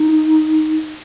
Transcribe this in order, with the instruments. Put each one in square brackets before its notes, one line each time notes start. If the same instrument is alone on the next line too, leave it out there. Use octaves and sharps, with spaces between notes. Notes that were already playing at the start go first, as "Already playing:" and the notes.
Already playing: [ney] D#4